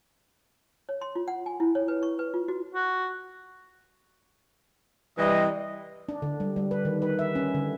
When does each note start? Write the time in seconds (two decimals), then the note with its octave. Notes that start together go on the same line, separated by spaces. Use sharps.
0.89 C#5
1.01 C6
1.15 F4
1.28 F#5
1.46 G#5
1.60 E4
1.75 C#5
1.88 B4
2.03 C#6
2.19 B4
2.34 F4
2.48 F#4
2.75 F#4
5.18 C3 E3 G3 D#5
6.09 D4
6.22 D3
6.40 G3
6.56 G3
6.71 B4
6.85 D#3
7.02 B4
7.19 E5
7.35 C#4
7.55 D3